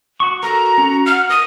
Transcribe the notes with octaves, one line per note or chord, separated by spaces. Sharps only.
F#4 C#6
F#4 A4 A#4 A#5
C#4 F#4
F#5 F6
A#4 D#6